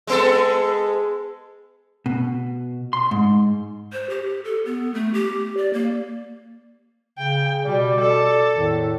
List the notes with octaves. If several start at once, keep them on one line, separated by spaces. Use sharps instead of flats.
G#3 B3 A4
B2
C6
G#2
C5
G4
A4
B3
A3
G4
D5
A#3
C#3 G5
B2 G3 D5
A4
E2 A2 D#3